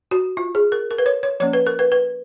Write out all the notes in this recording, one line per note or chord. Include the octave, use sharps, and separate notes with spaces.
F#4
F4
G#4
A#4
A#4
B4
C#5
C#5
F3 A#3 C#4 C#5
B4
A#4
B4
B4